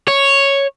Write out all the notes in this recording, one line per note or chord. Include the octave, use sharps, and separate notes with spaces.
C#5